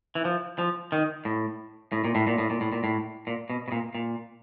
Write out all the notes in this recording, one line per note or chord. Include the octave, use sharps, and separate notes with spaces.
E3
F3
F3
D#3
A2
A2
A#2
A2
A#2
A2
A#2
A2
A#2
A2
A#2
B2
B2
A#2
A#2